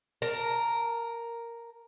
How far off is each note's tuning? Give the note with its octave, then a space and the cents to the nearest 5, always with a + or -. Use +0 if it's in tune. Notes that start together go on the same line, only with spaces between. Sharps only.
A#4 +0 A5 +25